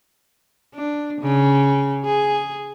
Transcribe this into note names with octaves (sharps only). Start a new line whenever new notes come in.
D4
C#3
G#4